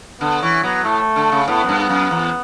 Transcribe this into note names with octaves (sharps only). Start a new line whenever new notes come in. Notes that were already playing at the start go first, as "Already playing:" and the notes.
D3 B3
E3 C#4
F#3 B3
A2 A3
D3
C#3
A2 B3
F#2
G2
B3
F#2
E2